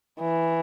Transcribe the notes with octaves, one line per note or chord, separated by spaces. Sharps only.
E3